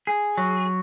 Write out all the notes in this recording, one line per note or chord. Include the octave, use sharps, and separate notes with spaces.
G#4
F#3